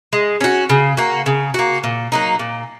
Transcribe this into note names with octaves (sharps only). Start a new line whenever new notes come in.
G#3
C#4 F#4
C#3
A#3 F#4
C#3
A#3 F#4
A#2
F#3 A#3 D#4
A#2